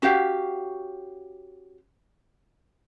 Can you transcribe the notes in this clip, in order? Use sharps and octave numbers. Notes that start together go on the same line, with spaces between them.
C#4 F#4 G4 F5